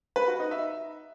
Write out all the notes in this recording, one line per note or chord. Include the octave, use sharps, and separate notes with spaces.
B4
F#4
D#4
E5